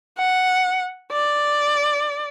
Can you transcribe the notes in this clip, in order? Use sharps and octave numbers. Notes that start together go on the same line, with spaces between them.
F#5
D5